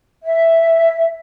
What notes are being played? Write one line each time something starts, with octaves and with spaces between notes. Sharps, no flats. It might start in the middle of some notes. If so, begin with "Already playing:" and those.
E5